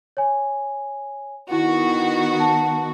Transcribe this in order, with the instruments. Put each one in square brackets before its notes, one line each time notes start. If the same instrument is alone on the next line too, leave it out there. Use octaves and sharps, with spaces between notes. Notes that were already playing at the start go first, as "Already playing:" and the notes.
[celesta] C#5 G#5
[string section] D#3 B3 F#4 [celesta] E4
[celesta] A5